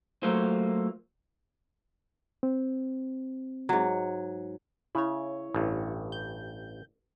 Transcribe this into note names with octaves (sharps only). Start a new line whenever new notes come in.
F#3 A3 A#3 F4 C5
C4
G#2 F#3
C#3 E4 C#5
A1 G2
G6